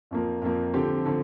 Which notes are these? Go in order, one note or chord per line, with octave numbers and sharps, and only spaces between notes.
F2 F3 A#3
F2 F3 A#3
D3 F3 C4 G4
D3 F3 C4